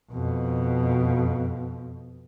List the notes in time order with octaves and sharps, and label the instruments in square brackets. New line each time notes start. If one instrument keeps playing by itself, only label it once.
[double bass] F2 B2